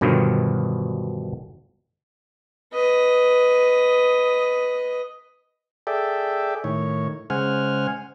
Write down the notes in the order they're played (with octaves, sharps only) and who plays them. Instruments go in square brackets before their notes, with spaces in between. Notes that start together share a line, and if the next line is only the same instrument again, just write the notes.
[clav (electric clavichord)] G2 B2 D3 D#3 F3 F#3
[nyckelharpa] B4 D#5
[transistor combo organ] G#4 A4 D5 E5 G5
A2 D#3 C#5
C#3 G#3 C5 F#5 G#5 F6